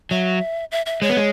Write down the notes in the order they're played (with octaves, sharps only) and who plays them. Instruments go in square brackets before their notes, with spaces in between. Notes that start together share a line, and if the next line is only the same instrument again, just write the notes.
[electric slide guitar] F#3 [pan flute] E5
[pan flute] E5
E5
[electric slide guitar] G#3 [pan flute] C#5
[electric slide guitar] B3
G#3